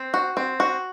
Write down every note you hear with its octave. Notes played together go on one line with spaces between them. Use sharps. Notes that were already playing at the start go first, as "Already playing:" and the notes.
Already playing: C4
F#4
C4
F#4